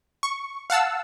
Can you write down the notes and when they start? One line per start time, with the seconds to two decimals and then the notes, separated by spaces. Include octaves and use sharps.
0.23 C#6
0.70 F5 F#5 A5 E6